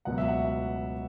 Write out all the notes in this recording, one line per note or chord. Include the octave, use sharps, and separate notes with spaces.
C#2 B2 F#3 F#5
E5
F#5